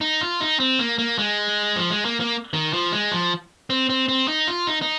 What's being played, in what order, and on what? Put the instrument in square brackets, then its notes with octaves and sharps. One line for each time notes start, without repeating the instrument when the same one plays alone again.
[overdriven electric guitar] D#4
F4
D#4
C4
A#3
A#3
G#3
F3
G#3
A#3
A#3
D#3
F3
G#3
F3
C4
C4
C4
D#4
F4
D#4
D#4